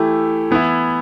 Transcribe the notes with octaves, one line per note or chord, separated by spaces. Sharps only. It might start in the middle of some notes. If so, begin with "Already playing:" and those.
Already playing: E3 A3 E4 G4
E3 B3 E4